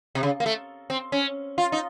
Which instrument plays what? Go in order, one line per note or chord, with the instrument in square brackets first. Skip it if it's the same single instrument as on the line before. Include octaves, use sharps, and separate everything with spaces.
[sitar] C3
C#3
A#3
A3
C4
C#4
F4
D#4